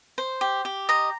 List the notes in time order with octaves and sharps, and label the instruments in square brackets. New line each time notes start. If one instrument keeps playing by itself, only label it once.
[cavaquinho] C5
G4
G4
D#5 A#5